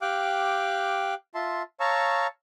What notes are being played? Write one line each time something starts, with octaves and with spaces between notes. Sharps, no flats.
G4 F5 G5 D6 F#6
F4 E5 A5 C6
C#5 F5 A5 A#5 C#6 E6